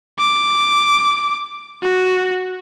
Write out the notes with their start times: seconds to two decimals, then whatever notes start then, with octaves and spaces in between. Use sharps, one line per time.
0.19 D6
1.82 F#4